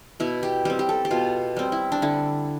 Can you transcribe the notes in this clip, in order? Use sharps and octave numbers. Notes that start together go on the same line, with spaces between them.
B2 E4
G4
G3 C4 G4
G4
A4
G4
B2 F4
G3 C4
E4
D4
D3 E4